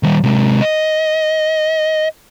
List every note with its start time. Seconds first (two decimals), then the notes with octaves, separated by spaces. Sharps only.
0.03 D#3 G3
0.24 C3 G#3
0.61 D#5